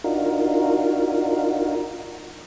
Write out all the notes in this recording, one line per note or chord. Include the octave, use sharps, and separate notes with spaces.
D4 D#4 F4 F#4 A#4